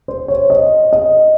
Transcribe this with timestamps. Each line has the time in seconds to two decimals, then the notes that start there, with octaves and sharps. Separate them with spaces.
0.08 C5
0.28 C#5
0.50 D#5
0.93 D#5